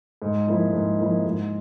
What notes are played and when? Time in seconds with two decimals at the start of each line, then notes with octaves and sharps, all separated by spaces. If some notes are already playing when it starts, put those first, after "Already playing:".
0.22 G#2
0.47 F3 A#3 E4
0.73 G#2
0.99 F3 A#3 E4
1.25 G#2